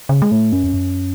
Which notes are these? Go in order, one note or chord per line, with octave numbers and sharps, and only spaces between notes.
C#3
G#3
A2 A3
F#2 C#4
F2
F#2